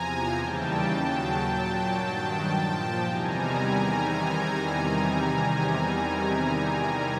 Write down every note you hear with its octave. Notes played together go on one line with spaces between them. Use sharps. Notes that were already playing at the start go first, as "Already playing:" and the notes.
Already playing: E2 C3 F3 G#5 A#5
D#2 C#3 E3 G3 G5 A5
D#2 C#3 F#3
A#2 F#3 G5 A5
G2 D#3 F#3
A#2 F3
E2 C3 D#3 G3 G#5 A#5